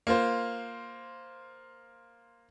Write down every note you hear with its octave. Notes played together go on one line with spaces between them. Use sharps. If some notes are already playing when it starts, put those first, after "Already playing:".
A#3 F4 C5